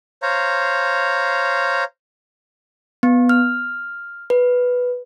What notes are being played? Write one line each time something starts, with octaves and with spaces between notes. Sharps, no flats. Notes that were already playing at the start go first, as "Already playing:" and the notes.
C5 C#5 F5 A#5
B3
F6
B4